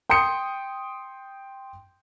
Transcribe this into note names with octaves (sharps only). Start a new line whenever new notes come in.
G5 C6 D#6 G6 C#7